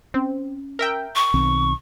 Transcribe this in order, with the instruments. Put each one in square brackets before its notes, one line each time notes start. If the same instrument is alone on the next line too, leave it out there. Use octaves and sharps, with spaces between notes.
[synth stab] C4 [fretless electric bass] C#4
[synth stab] A#4 E5 G5
[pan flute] C#6
[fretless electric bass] B1 D#3 C4